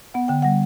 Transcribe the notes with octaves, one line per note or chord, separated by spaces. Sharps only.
B3 F#5
D3 G5
G3 F#5